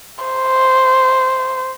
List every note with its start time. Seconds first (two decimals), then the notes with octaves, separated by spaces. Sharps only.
0.25 C5